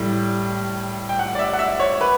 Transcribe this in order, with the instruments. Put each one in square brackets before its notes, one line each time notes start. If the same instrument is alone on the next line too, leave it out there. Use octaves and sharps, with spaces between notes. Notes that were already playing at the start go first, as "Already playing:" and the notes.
Already playing: [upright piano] A2 G3
[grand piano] G5
F#5
D5
E5
F#5
E5
C#5
B4